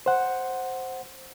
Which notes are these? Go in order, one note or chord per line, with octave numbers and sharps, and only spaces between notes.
C5 F#5